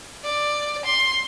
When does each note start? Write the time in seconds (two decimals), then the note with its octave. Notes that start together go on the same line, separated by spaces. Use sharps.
0.24 D5
0.85 C6